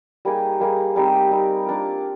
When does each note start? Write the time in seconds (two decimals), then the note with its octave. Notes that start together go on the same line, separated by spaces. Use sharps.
0.25 G3 A#3 D#4 G#4
0.60 G3 A#3 D#4 G#4
0.96 G3 C4 D#4 G4
1.31 G3 C4 D#4 G4
1.66 A#3 D4 F4